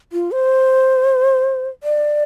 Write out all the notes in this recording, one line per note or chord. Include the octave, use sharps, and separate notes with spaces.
F4
C5
D5